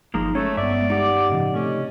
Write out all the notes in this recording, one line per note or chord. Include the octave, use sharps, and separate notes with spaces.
G1 F3 G#3 A#3 D#4 A#5
G#3 A3 C#4 A4 C#5
G2 B3 D5 E5
D#4 G4 F#5 D6
A2 C#3 F3 D#5
C3 A3 C#4